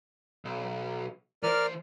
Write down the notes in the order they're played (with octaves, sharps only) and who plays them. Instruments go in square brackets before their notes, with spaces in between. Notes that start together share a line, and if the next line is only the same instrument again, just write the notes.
[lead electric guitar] B1
[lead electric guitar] E3 C5 [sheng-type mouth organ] A#4 D5 F6